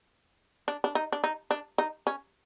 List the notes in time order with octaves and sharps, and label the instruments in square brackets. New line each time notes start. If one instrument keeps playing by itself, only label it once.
[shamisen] D4
D4
D#4
D4
D#4
D4
D#4
C#4